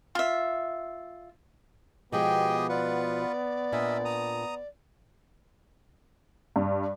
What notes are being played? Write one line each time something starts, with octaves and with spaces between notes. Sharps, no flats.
F4 E5
B2 F3 G#3 B3 G4 G#4 D#5 G5
F4 B4 D5 F#5
A#2 D4 A#4 D#5 E5 G#5
A#5 D#6
G2